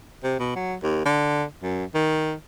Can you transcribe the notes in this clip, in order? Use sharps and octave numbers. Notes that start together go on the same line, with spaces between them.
C3
B2
F#3
D#2
D3
F#2
D#3